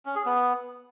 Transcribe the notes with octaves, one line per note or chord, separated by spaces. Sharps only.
C#4
G#4
B3